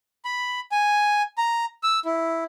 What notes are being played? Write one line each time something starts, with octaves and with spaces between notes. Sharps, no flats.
B5
G#5
A#5
E6
E4